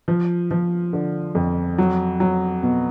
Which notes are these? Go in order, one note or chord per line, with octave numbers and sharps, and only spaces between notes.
F3
F3
D3
F2
F#3
F#3
B2